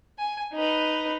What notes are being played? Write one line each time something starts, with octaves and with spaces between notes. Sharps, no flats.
G#5
D#4 B4